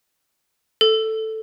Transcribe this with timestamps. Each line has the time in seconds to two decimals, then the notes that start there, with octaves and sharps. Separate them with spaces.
0.81 A4